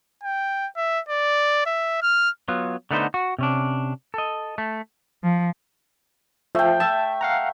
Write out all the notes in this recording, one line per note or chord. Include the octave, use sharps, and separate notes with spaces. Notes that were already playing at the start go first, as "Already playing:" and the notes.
G5
E5
D5
E5
F6
F#3 B3 F4
D3 A3 B3 D#4 A#4 C5
F#4
C3 C#4 D4
A4 D#5
A3
F3
F3 A3 G5
E5 A5
F5 F#5 A#5